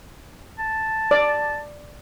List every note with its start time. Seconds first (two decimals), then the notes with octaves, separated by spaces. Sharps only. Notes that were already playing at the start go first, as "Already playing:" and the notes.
0.59 A5
1.11 D5